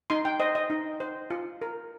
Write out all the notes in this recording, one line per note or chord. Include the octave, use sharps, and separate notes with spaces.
D#4 C6
G5
C5 D#5
D#5
D#4
C5
F4
A#4